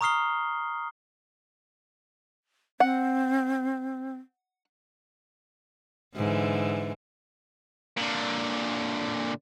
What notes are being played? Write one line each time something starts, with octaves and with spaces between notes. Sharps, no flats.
A#5 C#6 D#6 F6 C7 G7
C4 F#5
G#2 D3 E3
A#2 D3